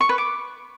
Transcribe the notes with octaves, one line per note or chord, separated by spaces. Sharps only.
C#6
B4
D6